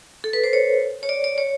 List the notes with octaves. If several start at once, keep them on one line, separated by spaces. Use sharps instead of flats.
A4
B4
C5
C#5
C#5
D5
D5
C#5